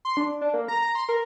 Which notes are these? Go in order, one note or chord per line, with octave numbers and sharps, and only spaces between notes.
C6
D4
D4
A#3
A#5
A#5
C6
A#4